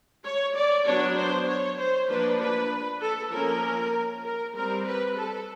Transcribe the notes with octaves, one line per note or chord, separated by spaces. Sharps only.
C#5
D5
F#3 B3 D4 C#5
C5
C#5
C5
F3 A#3 D4 B4
B4
A4
F3 A#3 C#4 A#4
A#4
G3 C4 A#4
B4
A4